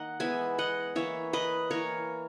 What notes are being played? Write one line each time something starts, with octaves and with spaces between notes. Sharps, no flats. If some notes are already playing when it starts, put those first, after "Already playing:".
Already playing: D#3 A#3 D#5 F#5
E3 G#3 B3 E5 G#5
D#5 F#5
E3 A#3 C#5 E5
B4 D#5
E3 A#3 A#4 C#5